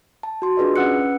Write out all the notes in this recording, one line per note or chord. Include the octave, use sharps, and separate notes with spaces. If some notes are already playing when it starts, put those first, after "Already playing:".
A5
F#4 C6
D4 F4 G#4 B4 D5 D#5
C#4 B4 F#5 E6 F#6 C#7